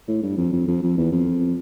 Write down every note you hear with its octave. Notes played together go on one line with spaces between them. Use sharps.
A2
G2
F2
F2
F2
F2
E2
F2